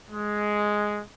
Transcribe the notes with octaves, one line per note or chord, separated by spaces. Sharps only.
G#3